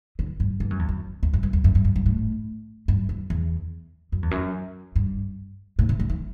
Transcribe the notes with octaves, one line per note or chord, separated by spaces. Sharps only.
D3
G2
G2
F#2
E2
F#2
E2
F#2
G2
E2
F#2
G2
F#2
G2
A2
G2
F#2
E2
F#2
E2
F#2
G2
A2
C3
D3
E3